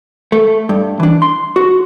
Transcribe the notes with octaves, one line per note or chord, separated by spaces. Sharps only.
A3
G2
E3 D4
C6
F#4